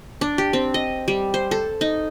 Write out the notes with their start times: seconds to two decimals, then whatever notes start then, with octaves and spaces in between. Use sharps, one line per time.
0.21 D4
0.38 G4
0.53 C4
0.74 D#5
1.08 G3
1.34 C5
1.51 A4
1.81 D#4